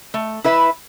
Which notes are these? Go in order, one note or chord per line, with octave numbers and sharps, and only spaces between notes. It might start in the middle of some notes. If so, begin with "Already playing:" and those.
A3
E4 B4 E5